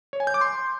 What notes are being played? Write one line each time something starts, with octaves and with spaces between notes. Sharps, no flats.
C#5
G#5
G6
D6
C6